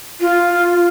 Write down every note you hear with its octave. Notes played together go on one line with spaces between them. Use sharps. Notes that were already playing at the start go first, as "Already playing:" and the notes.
F4